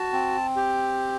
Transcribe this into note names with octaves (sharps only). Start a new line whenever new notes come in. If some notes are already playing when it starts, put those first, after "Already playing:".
Already playing: F#4 A5
C4
G4